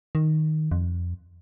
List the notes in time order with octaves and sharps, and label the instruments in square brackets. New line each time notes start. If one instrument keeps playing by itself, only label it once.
[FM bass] D#3
F2